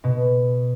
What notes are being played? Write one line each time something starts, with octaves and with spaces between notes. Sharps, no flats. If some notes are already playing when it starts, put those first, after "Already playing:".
B2